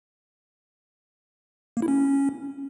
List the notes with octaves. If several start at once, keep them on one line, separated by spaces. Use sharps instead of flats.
A#3
E4
C#4